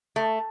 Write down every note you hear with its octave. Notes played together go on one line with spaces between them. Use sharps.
A3